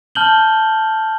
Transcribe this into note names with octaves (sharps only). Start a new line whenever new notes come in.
A5 F6 G6 F#7 G7